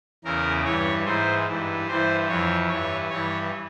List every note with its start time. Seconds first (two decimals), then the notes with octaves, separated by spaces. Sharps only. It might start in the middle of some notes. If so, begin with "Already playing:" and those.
0.24 E2 C#3 E3 A#4
0.65 G2 E3 C#5
1.05 G#2 E3 C5
1.47 G2 E3
1.87 G2 E3 C5
2.28 F2 E3 C#5
2.69 G2 E3 C#5
3.10 G2 E3 C#5